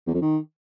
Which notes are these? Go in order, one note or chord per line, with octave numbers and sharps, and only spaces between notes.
E2
F2
D#3